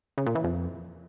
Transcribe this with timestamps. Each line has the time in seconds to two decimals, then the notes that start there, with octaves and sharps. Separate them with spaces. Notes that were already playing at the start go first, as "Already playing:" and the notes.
0.18 C#3
0.26 A#2
0.35 E3
0.44 F2